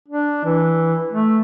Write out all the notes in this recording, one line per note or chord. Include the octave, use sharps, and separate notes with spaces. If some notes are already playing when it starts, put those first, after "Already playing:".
D4
E3
A3